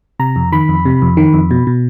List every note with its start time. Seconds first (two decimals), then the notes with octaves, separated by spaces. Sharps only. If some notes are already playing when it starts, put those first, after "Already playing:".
0.19 C3 A#5
0.36 F2
0.52 D#3 B5
0.69 F2
0.85 C3
1.02 F2
1.17 D#3
1.33 F2
1.51 B2
1.67 B2